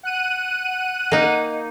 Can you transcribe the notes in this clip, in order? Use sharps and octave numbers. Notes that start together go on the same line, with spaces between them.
F#5 F#6 D#7
A#3 D#4